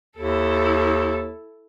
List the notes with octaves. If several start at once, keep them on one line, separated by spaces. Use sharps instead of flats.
D#2 E4 A4